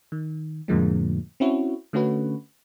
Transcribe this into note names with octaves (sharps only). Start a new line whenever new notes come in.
D#3
F2 A2 D3 F3 G#3 A#3
C4 C#4 E4 F#4
D3 A3 C#4 F#4 B4